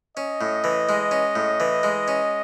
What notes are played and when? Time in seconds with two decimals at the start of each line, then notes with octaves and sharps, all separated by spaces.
0.16 C#4 D#5
0.41 A2
0.64 E3
0.89 G#3
1.11 C#4
1.36 A2
1.60 E3
1.83 G#3
2.08 C#4